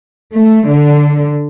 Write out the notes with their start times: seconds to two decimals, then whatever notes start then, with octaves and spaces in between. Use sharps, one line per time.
0.33 A3
0.68 D3